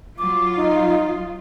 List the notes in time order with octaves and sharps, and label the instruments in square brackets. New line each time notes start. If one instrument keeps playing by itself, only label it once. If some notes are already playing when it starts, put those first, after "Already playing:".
[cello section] F#3 F4 [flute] D6
[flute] D#4